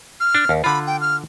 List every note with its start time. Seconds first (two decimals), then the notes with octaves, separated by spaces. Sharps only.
0.20 F6
0.35 D4
0.49 D#2
0.64 D3 F4 B5
0.87 G5
1.01 F6